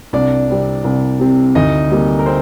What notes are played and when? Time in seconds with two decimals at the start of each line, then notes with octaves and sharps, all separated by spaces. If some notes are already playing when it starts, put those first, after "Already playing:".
0.13 C2 D4 D5
0.49 C3 G3 C4
0.84 C2
1.19 C3 G3 C4
1.55 D2 D#4 D#5
1.91 C3 G3 A#3
2.19 A#4
2.26 C4 C5